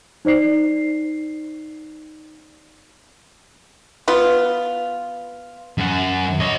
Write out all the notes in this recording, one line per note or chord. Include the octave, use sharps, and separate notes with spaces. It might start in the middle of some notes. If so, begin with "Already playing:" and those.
D#4 C5 D5 C7
B3 F4
F#2 F#5
C#5 D#5